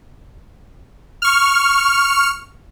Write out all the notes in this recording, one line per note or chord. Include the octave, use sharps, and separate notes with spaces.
C#6 F6